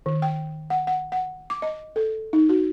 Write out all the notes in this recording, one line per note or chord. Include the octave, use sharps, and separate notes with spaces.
D#3
G5
F#5
F#5
F#5
D6
D#5
A4
D#4
F#4